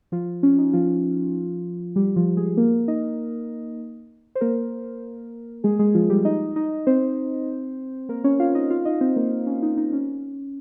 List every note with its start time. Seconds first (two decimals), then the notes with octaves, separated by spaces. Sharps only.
0.12 F3 F4
0.43 C#4
0.58 D#4
0.73 F3 F4
1.96 G3 G4
2.16 F3 F4
2.37 G#3 G#4
2.57 A#3 A#4
2.88 D#4 D#5
4.35 C5
4.41 A#3 A#4
5.64 G#3 G#4
5.79 G#3 G#4
5.94 F3 F4
6.10 G3 G4
6.25 D#4 D#5
6.56 D#4 D#5
6.87 C4 C5
8.09 A#3 A#4
8.24 C#4 C#5
8.39 F4 F5
8.55 D#4 D#5
8.70 F4 F5
8.85 D#4 D#5
9.01 C4 C5
9.16 A#3 A#4
9.47 C#4
9.62 D#4
9.77 D#4
9.93 C#4